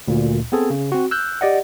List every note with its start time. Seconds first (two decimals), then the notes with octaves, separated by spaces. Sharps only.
0.08 D2 A#2
0.52 B3 C4 G#4 A4
0.70 C#3
0.92 C4 F#4
1.11 E6 F#6 G6
1.41 G4 D5 D#5 F#5